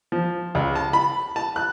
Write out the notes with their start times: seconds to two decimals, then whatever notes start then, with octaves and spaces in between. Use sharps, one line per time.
0.12 F3
0.55 C#2
0.75 A5
0.93 B5
1.36 A5
1.56 F#6